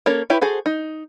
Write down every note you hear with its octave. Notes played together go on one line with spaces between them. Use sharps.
A#3 C#4 A4 C#5
E4 G4 B4 C#5
F#4 G#4 A4 C5
D#4